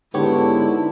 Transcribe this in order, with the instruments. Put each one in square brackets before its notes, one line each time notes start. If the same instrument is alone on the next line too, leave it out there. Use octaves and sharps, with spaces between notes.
[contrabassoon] G#2 [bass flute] D3 [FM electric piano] B3 G4 C#5 [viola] E4